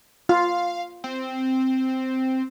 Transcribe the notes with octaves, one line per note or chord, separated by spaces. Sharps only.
F4 F5
C4